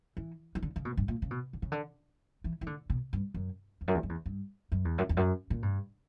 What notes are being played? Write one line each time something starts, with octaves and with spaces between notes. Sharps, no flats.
E3
E3
D3
C#3
B2
G2
A#2
C#3
B2
D3
C#3
D3
E3
E3
D3
B2
G2
F#2
E2
F#2
E2
F#2
E2
G2
F#2
E2
F#2
E2
F#2
A#2
G2